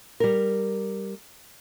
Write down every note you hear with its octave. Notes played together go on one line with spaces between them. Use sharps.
G3 A#4